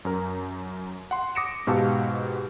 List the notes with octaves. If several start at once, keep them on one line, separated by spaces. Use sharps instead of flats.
F#2 A#4
F#5 C6
D6 D#6 A#6 C#7 D7 E7
G#2 B2 G4 F5 A5 E6